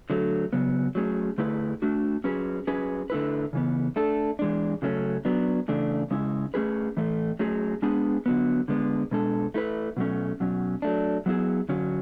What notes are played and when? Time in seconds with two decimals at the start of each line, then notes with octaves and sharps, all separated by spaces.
0.10 D3 F#3 A3
0.53 C#3 F#3 B3
0.95 F#3 A3 C#4 G#4
1.38 D3 A3 E4 G#4 B4
1.82 A3 D4 F#4
2.24 F#3 C#4 G#4 B4
2.67 F#3 C#4 G#4 B4
3.10 D3 A3 E4 B4
3.53 C#3 E3 B3
3.96 A3 D4 A4
4.39 E3 G#3 D4
4.82 C#3 F#3 A3 C#4
5.25 F#3 B3 D4
5.68 C#3 E3 A3 D4
6.10 C#3 G#3 C#4 E4
6.54 A3 C#4 G#4 B4
6.97 A2 E3 A3
7.39 F#3 A3 C#4 G#4
7.82 G#3 B3 D4 G#4 B4
8.26 D3 F#3 B3
8.68 D3 G#3 B3
9.11 B2 G#3 D4 A4
9.54 A3 E4 B4
9.97 B2 F#3 A3 C#4
10.40 B2 F#3 C#4
10.82 F#3 A3 D4
11.26 F#3 B3 E4 G#4
11.69 D3 F#3 C#4